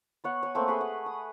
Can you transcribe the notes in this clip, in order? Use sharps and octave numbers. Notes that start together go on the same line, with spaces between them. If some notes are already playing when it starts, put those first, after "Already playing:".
B3 C#5 F#5
C#5 G#5
A3 A#3 C4
A3 G#4 B4
F#5
D#6